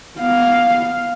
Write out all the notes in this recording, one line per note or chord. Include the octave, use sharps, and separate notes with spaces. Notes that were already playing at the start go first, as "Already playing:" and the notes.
B3 F5